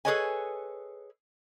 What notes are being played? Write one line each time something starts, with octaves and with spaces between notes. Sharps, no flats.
G#4 A4 B4 C#5 D#5 G#5